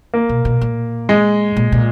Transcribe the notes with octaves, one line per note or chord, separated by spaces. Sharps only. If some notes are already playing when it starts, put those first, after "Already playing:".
A#3
B2
B2
A#2
G#3
A#2
A#2